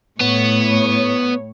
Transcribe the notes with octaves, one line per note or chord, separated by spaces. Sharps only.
A2 B3 C#5